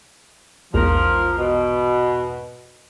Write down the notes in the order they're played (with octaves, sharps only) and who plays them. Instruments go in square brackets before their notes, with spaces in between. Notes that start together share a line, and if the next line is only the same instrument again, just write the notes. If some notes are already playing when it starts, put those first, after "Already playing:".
[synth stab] A#1 E2 G#2 [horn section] F3 A#4
[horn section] B2